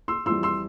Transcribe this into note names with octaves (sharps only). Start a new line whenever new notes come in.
C6 E6
F2 E3 G3 C6 E6
C6 E6